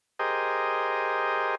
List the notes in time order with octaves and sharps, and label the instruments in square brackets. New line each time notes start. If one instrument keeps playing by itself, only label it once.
[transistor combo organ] G4 G#4 A#4 C5 D#5